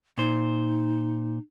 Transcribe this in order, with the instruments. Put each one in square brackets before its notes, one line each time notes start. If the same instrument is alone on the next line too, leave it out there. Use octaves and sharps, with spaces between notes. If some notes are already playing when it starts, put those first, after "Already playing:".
[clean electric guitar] A#2 C5 [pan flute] D#4